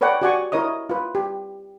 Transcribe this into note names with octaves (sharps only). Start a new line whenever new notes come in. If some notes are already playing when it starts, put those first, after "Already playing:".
A4 B4 C#5 D5 F#5 G5
F#4 G4 D5 F#5 G#5 C#6
E4 A#4 C#5 D#5 D#6
F4 B4
G4